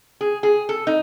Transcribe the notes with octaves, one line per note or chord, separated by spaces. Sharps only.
G#4
G#4
A4
D#4